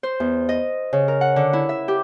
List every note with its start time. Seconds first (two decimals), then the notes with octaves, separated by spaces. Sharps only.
0.03 C5
0.20 E2
0.49 D#5
0.93 C#3
1.08 A#4
1.21 F#5
1.36 D3
1.53 E4
1.69 E5
1.88 G4